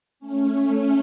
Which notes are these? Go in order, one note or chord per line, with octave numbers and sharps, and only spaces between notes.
A3 C#4